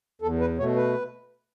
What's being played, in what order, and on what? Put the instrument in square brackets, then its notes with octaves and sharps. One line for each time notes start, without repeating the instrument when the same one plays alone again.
[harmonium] E2 A4
B4
B2 A3 C#5
B4